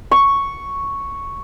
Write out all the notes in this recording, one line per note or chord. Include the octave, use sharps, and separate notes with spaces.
C#6